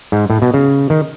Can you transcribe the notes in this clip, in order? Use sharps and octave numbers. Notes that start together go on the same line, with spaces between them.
G#2
A2
B2
C#3
D#3